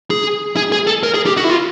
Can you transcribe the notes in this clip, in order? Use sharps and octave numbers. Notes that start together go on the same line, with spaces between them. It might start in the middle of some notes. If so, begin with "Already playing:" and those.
G#4
G#4
G#4
A4
A#4
G#4
G4
F#4
E4
F4